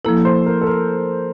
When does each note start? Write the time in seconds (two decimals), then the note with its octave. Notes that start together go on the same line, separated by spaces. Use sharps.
0.04 F3 A#3 E4 A4
0.25 C5
0.46 A#4
0.61 A4
0.67 A#4